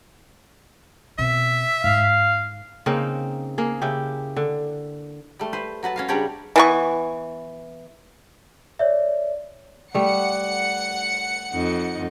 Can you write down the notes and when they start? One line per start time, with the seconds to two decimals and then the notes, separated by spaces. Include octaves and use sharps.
1.18 B2 C4 E5
1.84 G#2 F5
2.86 C#3 A#3 C4 D#4
3.58 A#3 G#4
3.82 C#3 E4 G4
4.36 D3
5.39 G3 A3
5.53 B4 C5
5.83 F#3 F#4 B4 A5
5.96 C#4 F#4 F5
6.08 C#3 G3 D4 G4 C#5 A#5
6.56 E3 B3 C#6
8.79 C#5 D5 E5
9.95 G3 A3 F#5 C#7
11.52 F2 D#4